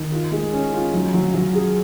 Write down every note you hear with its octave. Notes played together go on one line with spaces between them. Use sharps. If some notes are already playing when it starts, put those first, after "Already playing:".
Already playing: D#3
F4
G#3
C#4
F4
F#3
F#3
F#3
G#4